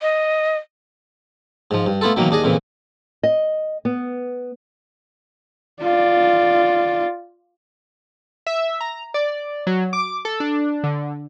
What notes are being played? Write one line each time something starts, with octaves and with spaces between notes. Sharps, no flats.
D#5
G#2 F3
G2
A3 B3 E4 F4 A4
B2 D#3 E3 F#3 A#3
D#2 D4 G#4 D#5
F2 A#2 C#3 E3
D#5
B3
F4 D5
E5
A#5
D5
F#3
D6
A4
D4
D3